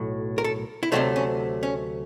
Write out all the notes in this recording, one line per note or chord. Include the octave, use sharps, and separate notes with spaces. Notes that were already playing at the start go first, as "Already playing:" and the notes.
Already playing: B1 A2 F#3
A#4
A4
E4
D2 C3 D#3 F#3 A3 D#4
C#4
C#4